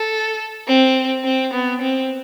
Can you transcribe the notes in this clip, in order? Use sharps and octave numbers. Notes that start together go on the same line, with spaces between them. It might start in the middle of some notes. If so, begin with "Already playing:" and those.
Already playing: A4
C4
C4
B3
C4